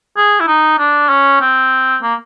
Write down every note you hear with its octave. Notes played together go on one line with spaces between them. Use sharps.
G#4
E4
D#4
D4
C#4
C4
A#3